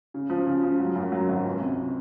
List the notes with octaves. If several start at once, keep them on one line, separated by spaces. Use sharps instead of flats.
C#3
F3
C#3
F3
F#3
F#2
F#3
G#1
C#2
C3